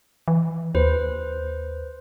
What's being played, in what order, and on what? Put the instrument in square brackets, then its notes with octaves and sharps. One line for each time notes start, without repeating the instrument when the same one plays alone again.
[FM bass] E3
[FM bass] D#2 [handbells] B4 C5